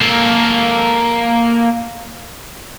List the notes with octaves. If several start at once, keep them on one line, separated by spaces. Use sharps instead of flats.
A#3 A4